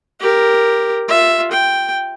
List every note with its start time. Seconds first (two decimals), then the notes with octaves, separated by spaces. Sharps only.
0.20 G4 A#4
1.08 F4 E5
1.51 G5